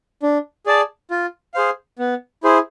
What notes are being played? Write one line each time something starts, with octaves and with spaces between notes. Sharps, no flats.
D4
G#4 D5 A5
F4
G#4 C5 F5
B3
E4 G#4 C5